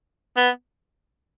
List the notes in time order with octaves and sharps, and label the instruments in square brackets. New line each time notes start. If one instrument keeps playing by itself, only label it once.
[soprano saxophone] B3